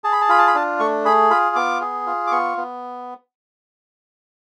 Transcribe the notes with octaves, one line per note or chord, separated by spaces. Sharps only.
G#4 A5
B5
A5
F4 B5
A5
B5
D4 A5
A3 C#6
G#4 B5
F4 B5
B3 D6
G#4
F4
D6
B3 C#6
B3